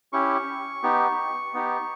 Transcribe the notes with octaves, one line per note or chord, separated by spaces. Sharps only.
C#4 E4 G4 C#6
B3 D#4 G4
B3 D#4 G4